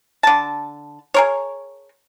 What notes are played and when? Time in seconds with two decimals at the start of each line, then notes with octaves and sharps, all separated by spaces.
0.23 D3 A5
1.14 G#4 A#4 C#5